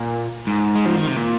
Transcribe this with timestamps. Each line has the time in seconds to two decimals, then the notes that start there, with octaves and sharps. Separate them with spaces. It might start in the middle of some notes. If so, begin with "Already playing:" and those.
Already playing: A#2
0.47 G#2
0.76 G#3
0.86 F3
0.96 D#3
1.07 C3
1.17 A#2